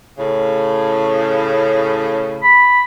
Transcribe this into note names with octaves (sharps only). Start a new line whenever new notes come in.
A2 C#3
B5